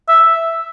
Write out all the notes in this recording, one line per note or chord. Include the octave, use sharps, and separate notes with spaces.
E5